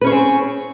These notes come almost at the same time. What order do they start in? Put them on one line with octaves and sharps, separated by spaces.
B4 C#4 C#5 G#4 C4